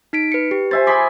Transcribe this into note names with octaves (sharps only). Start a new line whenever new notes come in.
D#4 B6 D7
B4 C#7
G4
C5 E5 G#5 A6
G#4 B5 C6 D6 B6